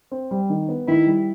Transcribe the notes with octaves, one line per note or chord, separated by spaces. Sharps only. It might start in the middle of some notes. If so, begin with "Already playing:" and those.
C4
G3
D#3
B3
D#3 E4
G3